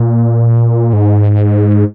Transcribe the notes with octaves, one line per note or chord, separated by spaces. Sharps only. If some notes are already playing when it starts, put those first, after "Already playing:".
Already playing: A#2
G#2